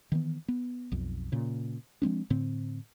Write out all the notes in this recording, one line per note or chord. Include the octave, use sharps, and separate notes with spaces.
D#3 E3 B3
B3
B1 F2
A#2 C#3
F3 G#3 C4 D4
A2 D3 C4